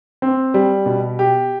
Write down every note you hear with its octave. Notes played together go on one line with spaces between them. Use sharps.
C4
G3
B2
G4